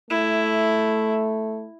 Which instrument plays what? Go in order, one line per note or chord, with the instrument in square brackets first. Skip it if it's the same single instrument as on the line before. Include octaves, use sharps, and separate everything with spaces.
[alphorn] A3 [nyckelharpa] E4